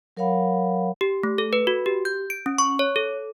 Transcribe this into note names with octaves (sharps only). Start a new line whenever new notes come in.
F#3 A#4 C#5 F5 F#5 B5
G4
A3
A4
B4
F#4
G4
G6
D7
C#4
C#6
C#5
A4